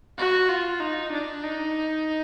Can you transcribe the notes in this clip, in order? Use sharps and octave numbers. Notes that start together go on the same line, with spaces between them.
F#4
F4
D#4
D4
D#4